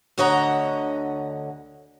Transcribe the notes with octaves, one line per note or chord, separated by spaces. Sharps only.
D2 D3 C#5 D#5 F#5 A#5